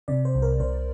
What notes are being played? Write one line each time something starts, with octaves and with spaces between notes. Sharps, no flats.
C3 D5
C5
C2
A#4
C2 C5